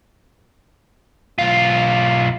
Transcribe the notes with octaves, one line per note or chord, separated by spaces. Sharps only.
B1 F4